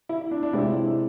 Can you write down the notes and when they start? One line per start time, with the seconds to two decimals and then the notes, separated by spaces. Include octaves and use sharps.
0.09 E4
0.31 D4
0.43 D4
0.53 C3 G#3 C4 E4 F4